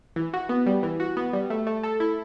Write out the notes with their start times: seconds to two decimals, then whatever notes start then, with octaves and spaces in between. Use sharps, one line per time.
0.16 E3
0.33 F#4
0.49 B3
0.66 G3
0.83 E3
1.00 F#4
1.17 B3
1.33 G3
1.50 A3
1.67 A3
1.83 A4
2.00 E4